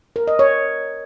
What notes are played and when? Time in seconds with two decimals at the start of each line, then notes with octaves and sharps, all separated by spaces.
0.16 A#4
0.27 D#5
0.39 C#5